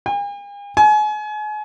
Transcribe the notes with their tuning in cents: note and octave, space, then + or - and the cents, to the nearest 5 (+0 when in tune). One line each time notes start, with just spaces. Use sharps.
G#5 -45
G#5 +35